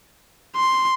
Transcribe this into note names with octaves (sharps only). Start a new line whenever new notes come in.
C6